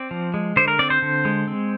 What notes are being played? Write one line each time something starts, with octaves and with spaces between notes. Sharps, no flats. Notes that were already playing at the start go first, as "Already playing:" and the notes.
Already playing: C4 D5
F3
G#3
D3 C5
A#4
C4 D5
C5
D3
G#3
C4